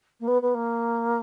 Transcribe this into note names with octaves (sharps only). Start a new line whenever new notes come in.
A#3
B3
B3
A#3